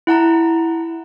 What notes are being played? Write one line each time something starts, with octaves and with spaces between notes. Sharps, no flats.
E4 F#5 A5 A#5